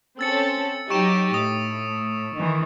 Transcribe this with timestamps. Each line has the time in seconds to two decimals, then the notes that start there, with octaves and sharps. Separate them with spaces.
0.19 C4 C#4 A4 E6 A6 C#7
0.90 F#3 D#4 G4 C#6 D7 E7
1.34 A2 D#6
2.34 D#3 E3